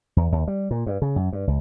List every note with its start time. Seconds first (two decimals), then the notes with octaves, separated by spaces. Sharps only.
0.17 E2
0.32 D#2
0.48 G3
0.71 A#2
0.86 G2
1.02 C#3
1.16 F#2
1.33 G2
1.47 C#2